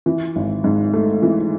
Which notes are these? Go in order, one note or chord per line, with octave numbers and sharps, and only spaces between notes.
E3
G#1
G#2
A3
E3